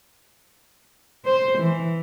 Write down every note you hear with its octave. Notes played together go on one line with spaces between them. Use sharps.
C5
E3